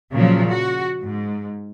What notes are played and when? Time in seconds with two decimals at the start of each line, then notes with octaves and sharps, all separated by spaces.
0.11 A#2 C#3 F3 F#3
0.49 F#4
1.01 G#2